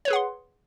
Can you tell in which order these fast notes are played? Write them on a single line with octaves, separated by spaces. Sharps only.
C#5 B4 G#4 F#5 C6